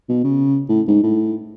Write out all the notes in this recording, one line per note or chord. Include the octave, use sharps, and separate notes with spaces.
B2
C#3
A2
G#2
A2